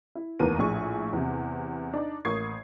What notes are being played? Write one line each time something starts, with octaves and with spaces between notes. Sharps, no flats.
E4
F1 D#2 E3 B3 A#4 D#7
A#1 A2 D4 G#4 C#6
E2 C3
D4 D#4 D5
A1 A#3 C#6 D#6 G#6 C7